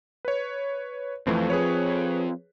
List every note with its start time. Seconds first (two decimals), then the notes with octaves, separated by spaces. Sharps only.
0.25 B4 C#5
1.27 F2 E3 F3 A3 C4
1.50 G#4 B4 C#5